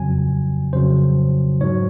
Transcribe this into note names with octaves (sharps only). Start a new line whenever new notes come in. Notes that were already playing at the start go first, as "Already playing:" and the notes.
Already playing: F2 C#3 F#3 G#5
F2 C#3 F#3 C5
G#2 F#3 C#5